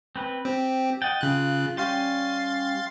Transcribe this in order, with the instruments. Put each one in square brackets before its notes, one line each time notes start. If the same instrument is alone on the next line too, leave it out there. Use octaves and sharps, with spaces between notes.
[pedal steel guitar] C4 B4
[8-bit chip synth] C4 [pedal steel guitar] G4
[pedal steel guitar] D#5 F#5 G5 [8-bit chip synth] A6
[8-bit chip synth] C#3 F#6 [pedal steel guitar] F4
[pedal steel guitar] G3 C#4 G4 [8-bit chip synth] F5 C6 A6